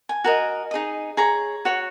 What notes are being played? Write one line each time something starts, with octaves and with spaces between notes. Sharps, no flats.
G#5
F#4 A#4 D#5
D#4 G#4 D#5
G#4 C#5 A#5
F#4 C#5